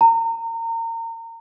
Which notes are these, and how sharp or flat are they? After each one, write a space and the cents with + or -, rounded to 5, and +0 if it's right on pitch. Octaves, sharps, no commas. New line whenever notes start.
A#5 -30